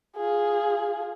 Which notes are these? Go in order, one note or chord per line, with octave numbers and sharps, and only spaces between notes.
F4 G#4